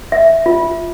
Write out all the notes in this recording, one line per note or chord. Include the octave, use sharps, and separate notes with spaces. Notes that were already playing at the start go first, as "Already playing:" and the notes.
E5
F4